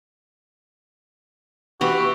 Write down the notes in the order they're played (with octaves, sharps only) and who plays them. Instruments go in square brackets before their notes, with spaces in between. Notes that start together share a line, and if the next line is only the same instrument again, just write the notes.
[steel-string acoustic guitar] E3 G4 [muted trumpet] F#4